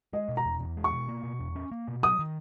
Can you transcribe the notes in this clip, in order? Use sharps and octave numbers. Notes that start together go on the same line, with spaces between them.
G#3 D#5
B2
A#5
E2
E2
G#3
C#6
B2
A#3
B2
E2
C#4
A#3
B2
F#3 D#6
D#3